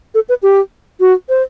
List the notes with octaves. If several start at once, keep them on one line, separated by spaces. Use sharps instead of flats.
A4
B4
G4
F#4
C5